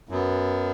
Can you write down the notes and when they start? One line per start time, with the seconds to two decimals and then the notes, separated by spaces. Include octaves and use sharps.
0.09 F#2 F#3 B3